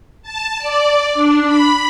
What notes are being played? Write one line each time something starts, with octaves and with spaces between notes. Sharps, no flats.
A5
D5
D4
B5